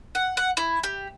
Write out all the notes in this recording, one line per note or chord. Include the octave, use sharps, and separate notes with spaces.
F#5
F#5
E4
G4